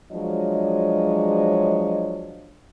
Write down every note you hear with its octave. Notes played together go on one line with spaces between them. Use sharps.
F3 F#3 G#3 D4 C#5 D#5